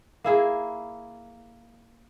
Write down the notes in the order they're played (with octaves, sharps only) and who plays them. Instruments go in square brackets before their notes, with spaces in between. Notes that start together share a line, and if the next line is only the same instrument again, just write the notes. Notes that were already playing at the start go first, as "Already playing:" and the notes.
[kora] A#3 E4 G#4